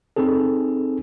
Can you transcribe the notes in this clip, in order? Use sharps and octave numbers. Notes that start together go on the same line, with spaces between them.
C4 D#4 G#4 A4